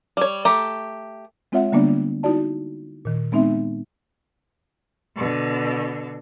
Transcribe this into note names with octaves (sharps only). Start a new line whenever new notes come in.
G3 C#5
A3 G4 A#5
G#3 C4 F4 C#5 E5 F#5
D3 G3 A#3 B3 D4 D5
D#4 E4 F#4 D5 A5
A#2 D#3
G#3 B3 C4 D#4 E5
B2 D3